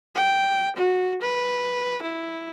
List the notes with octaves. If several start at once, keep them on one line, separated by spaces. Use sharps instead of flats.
G5
F#4
B4
E4